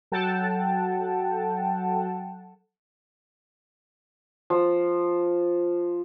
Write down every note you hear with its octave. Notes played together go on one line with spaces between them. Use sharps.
F#3 A4 F#5 G5 A5
F3